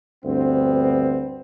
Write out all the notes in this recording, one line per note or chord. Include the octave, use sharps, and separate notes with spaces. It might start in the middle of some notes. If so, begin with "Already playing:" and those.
D2 G2 B3 C4